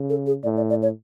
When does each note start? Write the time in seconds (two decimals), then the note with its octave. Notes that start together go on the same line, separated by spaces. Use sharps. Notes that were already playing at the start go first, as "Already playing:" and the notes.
Already playing: C#3
0.10 A4
0.26 G#4
0.43 A2 D5
0.57 D5
0.70 D5
0.82 C#5